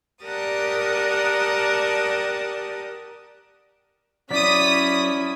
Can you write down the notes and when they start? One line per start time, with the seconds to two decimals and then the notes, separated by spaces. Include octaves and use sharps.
0.24 G4 A#4 D5 F#5 A5 D#6
4.31 F#3 C#4 E4 D5 D#6 B6